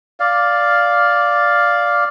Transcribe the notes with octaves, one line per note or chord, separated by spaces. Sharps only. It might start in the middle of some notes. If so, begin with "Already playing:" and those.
D5 F5